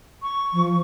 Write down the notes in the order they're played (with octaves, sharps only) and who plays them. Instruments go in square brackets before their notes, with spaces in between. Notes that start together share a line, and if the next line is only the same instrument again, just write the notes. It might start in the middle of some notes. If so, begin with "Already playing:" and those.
[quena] C#6
[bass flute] F3